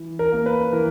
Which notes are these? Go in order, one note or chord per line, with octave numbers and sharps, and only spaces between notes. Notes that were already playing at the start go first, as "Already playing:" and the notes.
Already playing: E3
A#4
A#3
B4
E3 A#4